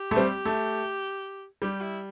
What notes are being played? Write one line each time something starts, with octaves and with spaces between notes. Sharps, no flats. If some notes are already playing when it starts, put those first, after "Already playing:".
Already playing: G4
A3
G3 C4
A3
G3 G4
E4